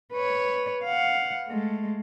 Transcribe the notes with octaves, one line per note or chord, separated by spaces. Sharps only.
B4 C#5
F5 F#5
G#3 A3